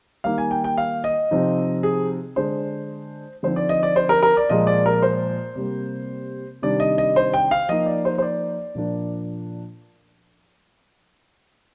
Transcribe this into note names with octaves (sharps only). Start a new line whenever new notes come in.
D#3 G3 A#3 D#4 F5
G#5
G5
G5
F5
D#5
C3 F3 C4 D#4
G#4
D3 G#3 D4 C5
D3 F3 C4 D#4 C5
D5
D#5
D5
C5
A#4
A#4
D5
A#2 F3 G#3 D#5
D5
A#4
C5
C3 G3 A#3
C3 D#3 G3 D4 D5
D#5
D#5
C5
G5
F5
F3 A#3 D#4 D#5
D5
C5
C5
D5
A#2 F3 A#3 D4